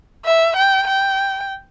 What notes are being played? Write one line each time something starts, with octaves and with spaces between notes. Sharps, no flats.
E5
G5
G5